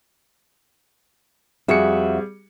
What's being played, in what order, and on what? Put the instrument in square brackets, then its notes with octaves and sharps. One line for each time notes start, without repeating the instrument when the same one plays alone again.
[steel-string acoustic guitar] F2 F#4 E5 [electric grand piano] G3 G#4 C#7